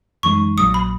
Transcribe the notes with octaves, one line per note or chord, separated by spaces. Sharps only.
F#2 E3 G#3 D#4 C#6
A#1 A#2 F#3 D#6
B5